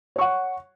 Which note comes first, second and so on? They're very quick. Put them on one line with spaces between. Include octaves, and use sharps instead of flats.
C#5 C#6 F#5